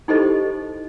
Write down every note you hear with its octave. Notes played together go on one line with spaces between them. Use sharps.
D#4 E4 G4 A4 C5 D#5